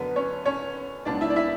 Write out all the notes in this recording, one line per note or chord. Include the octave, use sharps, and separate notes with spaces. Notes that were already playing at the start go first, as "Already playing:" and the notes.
Already playing: F#2 D3 F#3 B3 B4
C#4 C#5
C#4 C#5
C#2 B2 F#3 D4 D5
E4 E5
D5
E4 E5